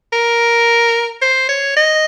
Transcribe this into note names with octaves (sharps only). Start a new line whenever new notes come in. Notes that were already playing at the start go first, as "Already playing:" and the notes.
A#4
C5
C#5
D#5